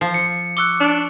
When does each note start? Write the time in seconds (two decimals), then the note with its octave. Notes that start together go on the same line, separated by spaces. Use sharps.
0.01 F3 C7
0.14 C#7
0.57 C#6 D6 E6 F#6 C#7 G7
0.80 D4